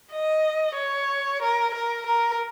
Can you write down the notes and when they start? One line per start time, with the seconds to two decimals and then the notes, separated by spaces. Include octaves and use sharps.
0.12 D#5
0.76 C#5
1.42 A#4
1.74 A#4
2.06 A#4